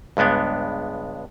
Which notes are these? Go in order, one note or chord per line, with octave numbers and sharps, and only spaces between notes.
C#2 G2 G#3 B3 D4